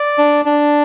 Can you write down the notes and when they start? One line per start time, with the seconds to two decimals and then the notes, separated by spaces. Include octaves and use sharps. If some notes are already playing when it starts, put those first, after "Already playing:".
Already playing: D5
0.18 D4
0.45 D4